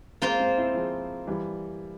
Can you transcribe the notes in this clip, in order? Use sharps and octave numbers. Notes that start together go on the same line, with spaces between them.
G#3 A#3 C4 F4 C5
G#3 C4
C4 E4
F3 G#3
E3 G3